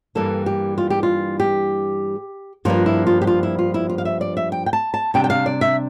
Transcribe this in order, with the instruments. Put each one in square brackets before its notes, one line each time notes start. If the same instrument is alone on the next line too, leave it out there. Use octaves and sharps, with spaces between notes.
[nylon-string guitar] G2 E3 G3 A#3 A4
G4
F4
G4
F4
G4
G2 F3 A#3 D4 F4
E4
F4
G4
F4
E4
F4
E4
F4
F5
E5
D5
E5
G5
G5
A5
A5
C3 G3 D4 G5
G5
F5
D5
E5